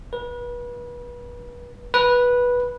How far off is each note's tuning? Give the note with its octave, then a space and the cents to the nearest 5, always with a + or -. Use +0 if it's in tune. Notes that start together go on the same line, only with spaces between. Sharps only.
B4 -30
B4 -10